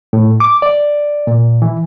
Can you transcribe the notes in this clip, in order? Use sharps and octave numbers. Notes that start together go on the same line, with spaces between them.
A2
D6
D5
A#2
E3